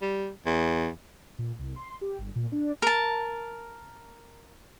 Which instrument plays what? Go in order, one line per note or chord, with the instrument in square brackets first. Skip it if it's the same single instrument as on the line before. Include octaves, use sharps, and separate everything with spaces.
[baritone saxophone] G3
E2
[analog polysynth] A#2
C2
C6
G4
G1
A#2
D4
[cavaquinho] A#4 A5